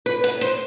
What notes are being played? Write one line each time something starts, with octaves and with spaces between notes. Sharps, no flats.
B4
B4
C5